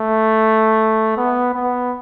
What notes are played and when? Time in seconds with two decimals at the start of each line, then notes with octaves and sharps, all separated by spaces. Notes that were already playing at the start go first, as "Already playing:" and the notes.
Already playing: A3
1.17 B3
1.54 B3